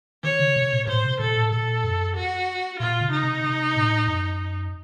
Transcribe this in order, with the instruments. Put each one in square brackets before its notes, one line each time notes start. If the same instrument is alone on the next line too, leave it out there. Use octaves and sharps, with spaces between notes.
[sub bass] D#3 [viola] C#5
[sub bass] C#3
C3
A#2
[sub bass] A2 [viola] C5
[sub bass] C3
[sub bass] A#2 [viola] A4
[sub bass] A2
[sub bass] A#2 [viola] A4
[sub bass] F#2
[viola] F#4
[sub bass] A#2 [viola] F4
[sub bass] C#3
[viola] D#4
[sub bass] C3
C3
A2
F#2